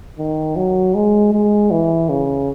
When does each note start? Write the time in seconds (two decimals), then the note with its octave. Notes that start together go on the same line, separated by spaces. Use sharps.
0.18 D#3
0.56 F#3
0.95 G#3
1.33 G#3
1.71 E3
2.09 C#3